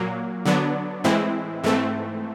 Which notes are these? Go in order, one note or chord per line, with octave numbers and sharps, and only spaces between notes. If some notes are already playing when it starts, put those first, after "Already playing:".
Already playing: A#2 F#3 A#3
D3 F#3 B3 D4
A2 E3 G#3 C4 E4
G#2 E3 A3 C4